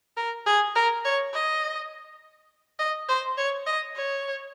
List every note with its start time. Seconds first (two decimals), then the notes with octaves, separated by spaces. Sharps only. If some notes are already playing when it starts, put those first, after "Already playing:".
0.17 A#4
0.46 G#4
0.75 A#4
1.05 C#5
1.34 D#5
2.79 D#5
3.09 C5
3.37 C#5
3.66 D#5
3.96 C#5